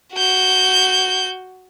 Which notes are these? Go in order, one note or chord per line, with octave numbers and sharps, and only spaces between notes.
F#4 G6